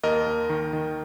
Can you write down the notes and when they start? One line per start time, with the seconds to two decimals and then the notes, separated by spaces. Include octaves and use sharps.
0.03 D#2 A#4 D#5
0.26 D#2
0.50 D#3
0.73 D#3